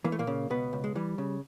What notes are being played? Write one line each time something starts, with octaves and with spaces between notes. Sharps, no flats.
E3 A#3
A3
A#2 A#3
C#3
C#2 B2 B3
C#2
G#3
E3 G3
C#3